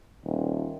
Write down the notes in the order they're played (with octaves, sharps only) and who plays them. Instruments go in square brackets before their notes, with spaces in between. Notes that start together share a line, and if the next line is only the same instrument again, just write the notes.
[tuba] D#1